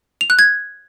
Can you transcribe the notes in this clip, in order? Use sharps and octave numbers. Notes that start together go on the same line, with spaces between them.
F7
F#6
G#6